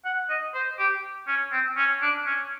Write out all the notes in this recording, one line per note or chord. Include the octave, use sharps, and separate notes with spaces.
F#5
D#5
C5
G4
C#4
C4
C#4
D4
C#4